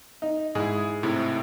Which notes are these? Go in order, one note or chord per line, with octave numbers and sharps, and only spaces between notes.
D#4
G#2 E4 G#4
A2 C3 E4